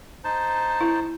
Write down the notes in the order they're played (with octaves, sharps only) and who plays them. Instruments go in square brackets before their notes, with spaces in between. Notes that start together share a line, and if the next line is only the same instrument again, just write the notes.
[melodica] D#4 C5 A5
[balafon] E4